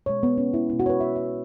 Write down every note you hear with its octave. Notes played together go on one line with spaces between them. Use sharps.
B2 G#3 C#5
B3
C#4
E4
B2 G#3 E4
F#4
C#5
B4
E5
E5